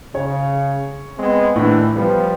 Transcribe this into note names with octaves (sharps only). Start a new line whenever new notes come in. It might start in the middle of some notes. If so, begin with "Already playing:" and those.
C#3 C#5
G#3 B3 C4
A2 D#3 E3 D4
F3 G3 B3